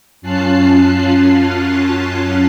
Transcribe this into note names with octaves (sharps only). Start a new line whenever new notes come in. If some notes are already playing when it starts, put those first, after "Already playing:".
F#2 C#4 F4 A5 F#6 C7